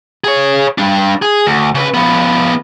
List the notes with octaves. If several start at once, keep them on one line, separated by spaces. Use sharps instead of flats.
G#4 C#5
G3 D4
G#4
D2
C#3 B4
F3 B3